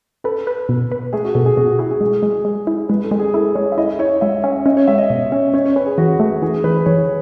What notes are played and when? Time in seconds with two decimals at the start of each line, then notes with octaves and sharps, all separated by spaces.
0.24 A4 B4
0.47 B4
0.69 B2
0.92 B4
1.13 A3 G#4
1.25 F#4
1.35 B2 A4
1.46 G#4
1.57 B2 F#4
1.68 F#4
1.79 E4 G#4
1.91 G#4
2.01 G#3
2.23 G#3
2.45 G#3
2.67 E4
2.89 G#3 B4
3.04 A4
3.11 G#3
3.19 G#4
3.34 E4 A4
3.55 G#3 C#5
3.72 E5
3.78 E4 D#5
3.99 E4 C#5
4.21 G#3 E5
4.44 C#4 E5
4.66 C#4 D#5
4.77 C#5
4.87 G#3 E5
4.98 D#5
5.10 B2 D#5
5.32 C#4 C#5
5.54 C#4 C#5
5.65 C#5
5.76 C#4 B4
5.86 G#4
5.98 E3 F#4
6.20 A3
6.42 E3 G#4
6.64 E3 B4
6.77 B4
6.86 E3 C#5